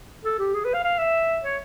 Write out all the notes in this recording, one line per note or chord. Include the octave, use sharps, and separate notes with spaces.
A4
G4
G#4
B4
F5
F5
E5
C#5